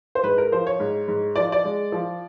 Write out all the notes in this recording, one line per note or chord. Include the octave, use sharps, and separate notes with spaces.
C5
G#2 B4
A#4
F3 C5
C#5
G#2
G#2
F3 D5
D5
G#3
F3